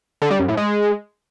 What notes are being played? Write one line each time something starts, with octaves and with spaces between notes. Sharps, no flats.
D3
G3
F#2
A2
G#3